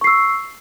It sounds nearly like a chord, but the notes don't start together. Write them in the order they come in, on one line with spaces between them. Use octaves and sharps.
C#6 C7 E6